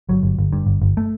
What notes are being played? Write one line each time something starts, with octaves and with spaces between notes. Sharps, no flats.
G1 F#3
G1
G1
G2
G1
G1
A3